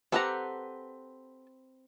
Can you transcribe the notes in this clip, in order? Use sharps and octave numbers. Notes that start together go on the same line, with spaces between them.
C4 G4 A4 B4 F#5 A#5